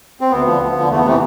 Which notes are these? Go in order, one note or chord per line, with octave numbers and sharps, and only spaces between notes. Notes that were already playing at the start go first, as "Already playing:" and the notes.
C4
D2 B3
D3 F3
D2
D3 F3
E2 A3
B3
C3 E3 A3